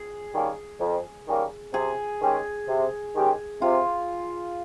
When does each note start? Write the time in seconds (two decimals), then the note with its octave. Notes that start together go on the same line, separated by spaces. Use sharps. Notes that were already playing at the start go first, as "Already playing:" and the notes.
Already playing: G#4
0.33 D#3 G3 A#3 C#4
0.80 F2
1.27 D#3 G3 A#3 C#4
1.74 C3 G#4
2.20 D#3 G#3 C#4 G4
2.68 C3
3.15 D#3 G#3 C#4 G4
3.61 C3 F4